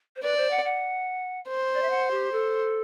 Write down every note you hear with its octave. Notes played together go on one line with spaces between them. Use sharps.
C5
B4 D5
C5
F#5
F#5
C5
D5
E5
F#5
G4
A4